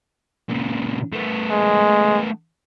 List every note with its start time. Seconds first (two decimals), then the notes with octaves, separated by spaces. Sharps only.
0.49 A#2 C#3
1.13 A3 B3
1.50 G#3